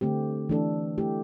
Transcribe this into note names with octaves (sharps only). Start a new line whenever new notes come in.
D3 A3 C4 G4
E3 A3 D4 A4
A3 E4 G4